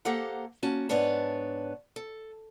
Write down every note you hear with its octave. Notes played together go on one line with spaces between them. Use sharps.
A#3 G4 A4 C5 F#5 A#5
A#3 C#4 F#4 A5
G#2 B3 D4 B4 C#5 A5
A4